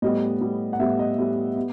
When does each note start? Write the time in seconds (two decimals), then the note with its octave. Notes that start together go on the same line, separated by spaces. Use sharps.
0.02 A2 G3 B3 D#5
0.41 A2 G3 B3
0.73 F#5
0.80 A2 G3 B3 E5
0.99 D#5
1.18 A2 G3 B3
1.56 B3